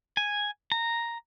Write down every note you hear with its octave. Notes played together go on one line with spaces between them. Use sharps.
G#5
A#5